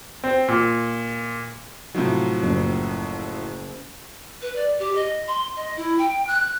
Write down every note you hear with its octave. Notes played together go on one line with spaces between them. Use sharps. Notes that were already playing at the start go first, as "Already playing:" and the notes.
C4
A#2
A2 C3 F3 F#3 D#4
F#1
B4
D5
G4
D#5
C6
D#5
E4
G5
F#6